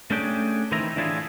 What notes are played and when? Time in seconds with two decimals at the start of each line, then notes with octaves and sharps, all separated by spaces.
0.11 A3 C#4 D4 G4 G#4 G5
0.72 D#3 E3 C4 D#4 E4 A#5
0.96 A2 E3 D4 E4 F4 G#4